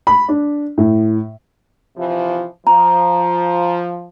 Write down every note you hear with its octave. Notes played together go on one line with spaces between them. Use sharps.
B5
D4
A2
C3 E3 F3
F3 A#5